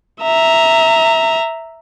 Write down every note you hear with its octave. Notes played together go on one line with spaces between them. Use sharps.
E5 A#5